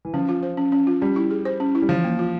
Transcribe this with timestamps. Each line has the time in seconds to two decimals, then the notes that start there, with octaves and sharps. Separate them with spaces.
0.05 E3
0.14 F3 C#4
0.29 F4
0.43 C5
0.57 C#4
0.72 C#4
0.87 F4
1.01 G3 C#4
1.16 E4
1.31 G#4
1.45 C5
1.60 C#4
1.75 E4
1.82 G3
1.89 E3 F3
2.04 A#3
2.19 F4